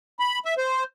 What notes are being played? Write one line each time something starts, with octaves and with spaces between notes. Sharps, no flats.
B5
E5
C5